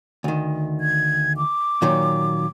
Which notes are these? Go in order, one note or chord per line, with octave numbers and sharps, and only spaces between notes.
D2 D#3
G#6
D6
A#2 D#3 F#3